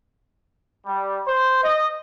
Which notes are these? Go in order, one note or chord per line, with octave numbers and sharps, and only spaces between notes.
G3
C5
D#5